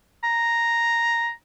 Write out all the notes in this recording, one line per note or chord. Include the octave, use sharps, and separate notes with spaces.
A#5